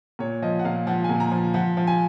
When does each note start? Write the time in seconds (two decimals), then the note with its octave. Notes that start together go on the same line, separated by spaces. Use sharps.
0.19 A#2 C#5
0.42 F3 D#5
0.59 F#5
0.65 A#2 F5
0.87 F3 F#5
1.04 G#5
1.09 A#2
1.20 A#5
1.31 F3
1.54 F3 F#5
1.77 F3
1.87 G#5